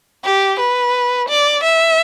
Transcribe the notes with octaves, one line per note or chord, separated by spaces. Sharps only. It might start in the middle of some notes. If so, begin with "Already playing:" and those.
G4
B4
D5
E5